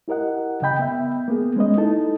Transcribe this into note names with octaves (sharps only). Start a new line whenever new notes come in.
E4 G4 A#4 D#5 F#5
C#3 D#5 G5 B5 G6
B3 E5
A#3 B3 G#4
G#3 C#4 B4 D#5
D#4 E4 A4 A5